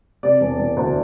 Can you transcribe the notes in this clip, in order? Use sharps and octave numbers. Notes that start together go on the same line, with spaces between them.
C3 D5
E1
E1
D2